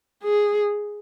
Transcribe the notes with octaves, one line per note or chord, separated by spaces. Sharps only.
G#4